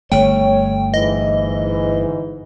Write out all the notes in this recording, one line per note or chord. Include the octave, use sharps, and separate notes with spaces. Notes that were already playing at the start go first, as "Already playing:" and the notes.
G1 A3 C#5 G5
G#2 E3 D#5